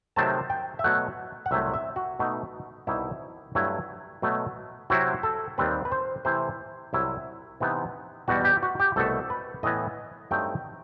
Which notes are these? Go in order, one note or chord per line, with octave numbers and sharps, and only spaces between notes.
C3 D#3 F#3 A3 C4 A5
G5
E5
B2 F#3 A3 F#5
F#5
C2 C3 F#3 A3 E5
E5
F#4
B2 A3 D#4
C2 B2 G3 D#4 E4
G2 F#3 A3 E4
B2 F#3 A3
C3 F#3 C4 E4 F#4
A4
D#2 D#3 G3 C4 B4
B4
C5
C3 E3 A3 E4 C5
C2 C3 F#3 E4
C3 E3 B3 D#4
E2 B2 G3 F#4
G4
F#4
G4
C2 B2 A3 A4
B4
A2 E3 B3 D#5
G2 F#3 A3 C4 D#4 G5